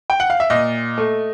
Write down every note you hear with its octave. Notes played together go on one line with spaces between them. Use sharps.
G5
F#5
F5
E5
A#2 D#5
A3